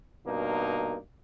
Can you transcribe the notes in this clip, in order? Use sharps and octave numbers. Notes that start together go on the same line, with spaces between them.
G2 B2 A#3 D#4